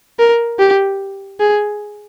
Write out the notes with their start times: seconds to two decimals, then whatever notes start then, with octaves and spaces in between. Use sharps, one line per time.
0.19 A#4
0.59 G4
1.40 G#4